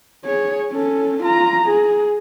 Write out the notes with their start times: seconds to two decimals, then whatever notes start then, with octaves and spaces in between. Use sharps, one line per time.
0.25 G#4 C#5
0.72 C#4 A4
1.22 F4 A#5
1.65 G#4